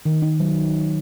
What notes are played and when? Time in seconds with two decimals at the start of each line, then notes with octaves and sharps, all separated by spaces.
0.06 D#3
0.22 D#4
0.40 F#3